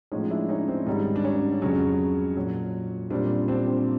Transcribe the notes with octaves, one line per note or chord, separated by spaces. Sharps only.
A2 F3 G#3 C#4 D#4
D4 E4
C#4 D#4
C4 D4
G#2 D#3 G3 C#4 D#4
D4
C#4
F2 C#3 F#3 C#4
A#2 F#3
A#2 G3 C4 D4
C4 D4
C4